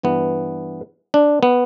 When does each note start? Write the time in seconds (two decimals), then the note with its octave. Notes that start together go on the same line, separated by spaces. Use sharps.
0.03 G2 E3 B3
1.14 D4
1.43 B3